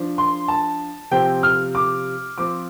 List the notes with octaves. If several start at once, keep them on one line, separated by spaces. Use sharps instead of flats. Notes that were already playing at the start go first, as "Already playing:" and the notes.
Already playing: F3 D4
C6
A5
C3 F3 C4 G5
F6
D6
F3 C4 D6